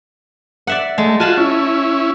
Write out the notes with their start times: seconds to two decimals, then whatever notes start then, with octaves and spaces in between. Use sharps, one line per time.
0.67 D5 E5 F#5
0.98 G#3 A3
1.20 F4 F#4 G#5 A5 B5
1.38 C#4 E4